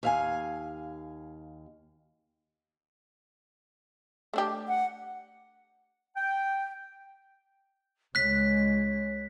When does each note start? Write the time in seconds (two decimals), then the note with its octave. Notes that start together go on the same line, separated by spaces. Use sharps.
0.03 D#2 F5 G#5
4.34 A3 D4 G4
4.68 F#5
6.16 G5
8.15 C#2 G#3 C#5 F#6 B6